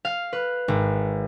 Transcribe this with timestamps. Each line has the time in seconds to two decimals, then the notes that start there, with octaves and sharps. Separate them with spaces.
0.05 F5
0.33 B4
0.68 G#1